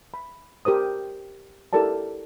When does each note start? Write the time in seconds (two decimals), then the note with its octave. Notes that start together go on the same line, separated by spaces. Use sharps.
0.14 B5
0.65 G4 A#4 C5 D#6
1.73 E4 G4 A4 A#4 D5 A5